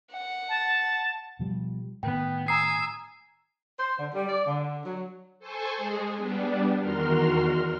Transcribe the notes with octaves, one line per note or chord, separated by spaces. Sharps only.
F#5
A5
B2 F3 G3
A2 D#3 B3 G5
G#5 A#5 D#6 E6 C7
C5
D3
G3
D5
D3
F#3
A4 C5 G#5 C#6
G#3 G#4
G3 B3 D4
E2 D#3 F#4 A#4 C6 F6